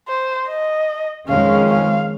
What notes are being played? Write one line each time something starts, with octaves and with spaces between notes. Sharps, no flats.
C5
D#5
F2 D#3 G#3 C#4 F5
F5